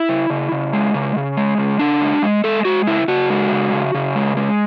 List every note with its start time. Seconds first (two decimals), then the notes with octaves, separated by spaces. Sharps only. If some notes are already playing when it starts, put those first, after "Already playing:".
Already playing: E4
0.09 C#3
0.30 C#3
0.52 C#3
0.73 G#3
0.94 C#3
1.16 C#3
1.37 G#3
1.58 C#3
1.79 C#3 D4
2.02 G#3
2.22 G#3
2.44 G#3 A4
2.65 G#3 F#4
2.87 C#3 E4
3.08 C#3 F#4
3.30 G#3
3.52 C#3
3.73 C#3
3.95 C#3
4.15 G#3
4.37 G#3